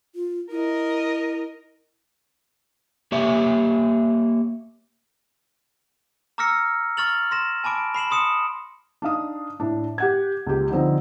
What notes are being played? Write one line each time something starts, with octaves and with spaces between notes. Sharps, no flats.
F4
E4 A#4 D#5
A#3 G4 C#5 E5
A#5 D6 E6 F6 A#6 C#7
C#6 F6 A6 F7 F#7
C6 A#6 E7
G#5 A5 B5 D6 D7
B5 C7 E7 F#7
B5 C6 D#6 C#7 E7
D4 D#4 F5 D#6
A2 D4
G4 F#5 G#6
C#2 G4
D3 F3 C4 D#4